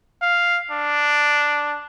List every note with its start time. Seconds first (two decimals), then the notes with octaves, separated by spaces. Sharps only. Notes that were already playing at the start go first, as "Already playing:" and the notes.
0.22 F5
0.72 D4